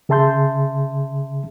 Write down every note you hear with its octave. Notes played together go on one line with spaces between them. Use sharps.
C#3 G#4 E5 A5 C6 G6